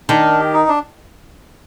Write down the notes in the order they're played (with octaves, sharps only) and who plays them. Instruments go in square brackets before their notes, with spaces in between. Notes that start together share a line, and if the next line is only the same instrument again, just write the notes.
[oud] D#3 [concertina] D4
[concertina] G4
D#4
D4